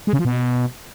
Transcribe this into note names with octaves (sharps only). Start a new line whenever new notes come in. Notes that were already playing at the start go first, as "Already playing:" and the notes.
G#3
C#3
F3
B2